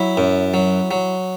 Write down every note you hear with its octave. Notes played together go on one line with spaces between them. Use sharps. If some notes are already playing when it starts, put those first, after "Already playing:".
Already playing: F#3 E4
F#2
F#3
F#3